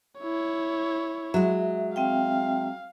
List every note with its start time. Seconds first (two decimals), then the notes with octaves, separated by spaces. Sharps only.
0.20 E4 C#5
1.34 F#3 G#3 E5
1.96 C4 E5 F5 G5